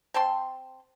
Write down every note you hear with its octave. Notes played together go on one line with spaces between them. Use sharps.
C4 G5 A5 C6